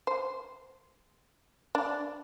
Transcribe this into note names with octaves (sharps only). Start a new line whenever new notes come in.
C5
D4